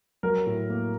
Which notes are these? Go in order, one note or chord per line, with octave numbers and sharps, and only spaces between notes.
F#3 A#4
A2
A#3